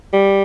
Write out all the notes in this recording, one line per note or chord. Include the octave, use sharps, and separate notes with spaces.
G3